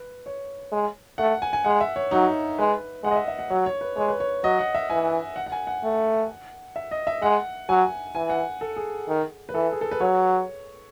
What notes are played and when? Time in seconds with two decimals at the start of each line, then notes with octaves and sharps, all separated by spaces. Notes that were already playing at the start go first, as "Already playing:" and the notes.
Already playing: B4
0.26 C#5
0.72 G#3
1.18 A3 F#5
1.42 G#5
1.53 G#5
1.64 G#3 F#5
1.81 E5
1.96 C#5
2.11 F#3 D#4
2.58 G#3 B4
3.04 G#3 F#5
3.11 D#5
3.16 E5
3.28 E5
3.39 F#5
3.50 F#3 C#5
3.66 C#5
3.81 B4
3.97 G#3 C#5
4.08 B4
4.20 C#5
4.44 F#3 D#5
4.59 F#5
4.75 E5
4.90 E3 G#5
5.36 F#5
5.46 F#5
5.52 G#5
5.67 F#5
5.83 A3
6.76 E5
6.91 D#5
7.07 E5
7.22 G#3 F#5
7.69 F#3 G#5
8.15 E3 G#5
8.30 F#5
8.61 A4
8.77 G#4
9.08 D#3
9.49 B4
9.54 E3 A4
9.72 G#4
9.81 A4
9.91 B4
10.00 F#3 C#5